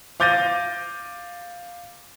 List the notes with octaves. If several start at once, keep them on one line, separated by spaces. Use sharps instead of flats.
F5 D6 G6 A6 A#6 D#7